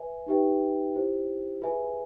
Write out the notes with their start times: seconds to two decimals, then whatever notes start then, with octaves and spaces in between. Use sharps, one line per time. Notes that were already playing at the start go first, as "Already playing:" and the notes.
Already playing: B4 E5 G#5
0.26 D#4 G4 B4 E5 G5
0.95 E4 G4 C5
1.62 F4 G#4 B4 E5 G#5